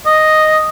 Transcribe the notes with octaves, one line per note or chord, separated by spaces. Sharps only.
D#5